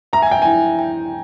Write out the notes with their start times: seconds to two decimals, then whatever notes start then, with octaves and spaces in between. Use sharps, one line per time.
0.13 E5 A#5
0.22 G#5
0.31 G5
0.42 E4 G#5
0.79 G5